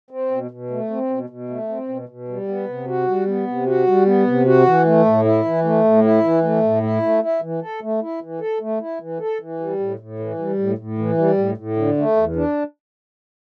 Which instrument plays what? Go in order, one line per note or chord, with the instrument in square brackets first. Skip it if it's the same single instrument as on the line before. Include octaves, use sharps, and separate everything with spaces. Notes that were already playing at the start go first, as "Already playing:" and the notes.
[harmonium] C4
B2
B2
A3
C4
B2
B2
A3
C4
B2
B2
G3
B3
C3
F#4
G3
B3
C3
F#4
G3
B3
C3
F#4
E3
A3
A2
E4
E3
A3
A2
E4
E3
A3
A2
E4
A3
E4
E3
A4
A3
E4
E3
A4
A3
E4
E3
A4
E3
G3
A2
A2
E3
G3
A2
A2
E3
G3
A2
A2
D3
A3
E2
D4